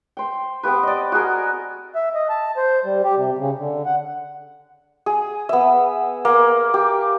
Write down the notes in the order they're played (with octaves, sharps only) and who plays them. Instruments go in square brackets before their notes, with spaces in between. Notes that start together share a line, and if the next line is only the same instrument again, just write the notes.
[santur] C5 G5
B3 C4 G4 B4
D5 D#5
F#4 G#4 A#4
[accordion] E5
D#5
A5
C5
G3
G4
C3
C#3
D3
F#5
[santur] G#4
B3 E5
A#3
G4